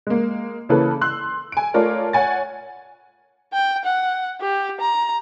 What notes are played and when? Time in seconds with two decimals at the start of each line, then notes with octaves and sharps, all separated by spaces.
0.07 G#3 A#3
0.69 C#3 E3 A#3 C#4 A4 B4
1.01 C6 E6 F#6
1.52 G#5 D7
1.74 A3 F4 A#4 C#5 D5
2.13 C#5 F#5 G#5 A6
3.53 G5
3.85 F#5
4.41 G4
4.81 A#5